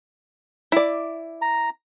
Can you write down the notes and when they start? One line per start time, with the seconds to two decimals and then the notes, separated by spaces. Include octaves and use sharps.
0.72 E4 D5
1.42 A#5